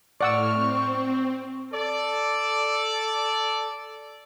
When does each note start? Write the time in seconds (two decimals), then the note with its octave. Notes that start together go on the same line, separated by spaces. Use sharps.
0.21 A2 D5 F#5 C#6 E6 F6
0.53 C4
1.73 A4 D5